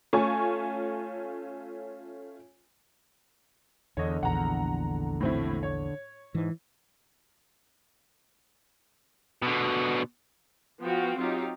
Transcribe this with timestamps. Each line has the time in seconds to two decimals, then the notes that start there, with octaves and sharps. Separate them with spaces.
0.13 A3 C#4 F4 G#5 C#6
3.97 E2 D3 C#5 D#5
4.23 A#1 E2 F#5 A#5
5.21 A2 C4 E4
5.63 C#5
6.35 G#2 E3
9.43 B2 D3
10.82 F3 B3 F#4 F5 G5
11.17 F#3 C4 D#4 F4 G4